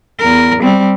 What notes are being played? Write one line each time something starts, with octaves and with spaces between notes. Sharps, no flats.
E2 A#4
G3 C4